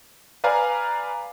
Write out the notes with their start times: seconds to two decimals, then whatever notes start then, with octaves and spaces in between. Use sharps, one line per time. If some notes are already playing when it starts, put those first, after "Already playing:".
0.44 B4 D5 F5 G#5 A#5